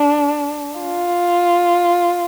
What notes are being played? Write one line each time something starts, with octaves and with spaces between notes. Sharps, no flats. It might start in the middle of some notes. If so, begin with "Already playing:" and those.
Already playing: D4
F4